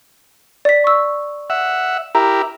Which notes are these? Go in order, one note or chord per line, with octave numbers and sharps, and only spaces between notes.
D5 B6
C#6 E6
E5 F#5
E4 G4 A#4 A#5